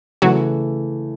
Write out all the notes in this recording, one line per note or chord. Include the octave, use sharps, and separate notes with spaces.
C#3 E3 F#3 A3 F#4